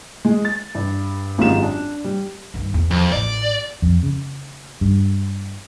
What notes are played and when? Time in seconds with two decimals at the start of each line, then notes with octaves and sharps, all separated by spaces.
0.25 G#3
0.45 A6
0.75 G2
1.38 G#1 F#2 G#3 F4 G4 E7
1.63 D4
2.04 G3
2.54 G2 D#3
2.74 E2
2.91 F2
3.12 A1 D5
3.82 F2
4.03 C#3
4.81 G2